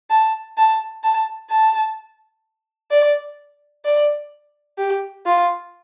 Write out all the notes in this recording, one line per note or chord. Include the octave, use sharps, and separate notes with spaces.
A5
A5
A5
A5
D5
D5
G4
F4